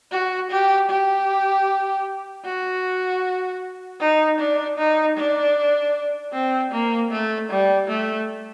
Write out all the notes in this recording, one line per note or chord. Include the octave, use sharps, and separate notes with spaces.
F#4
G4
G4
F#4
D#4
D4
D#4
D4
C4
A#3
A3
G3
A3